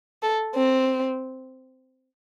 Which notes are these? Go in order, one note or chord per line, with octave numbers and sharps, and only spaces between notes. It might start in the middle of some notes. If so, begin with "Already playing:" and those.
A4
C4